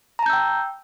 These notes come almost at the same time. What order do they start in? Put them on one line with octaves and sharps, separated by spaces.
A#5 A5 G6 E6 G5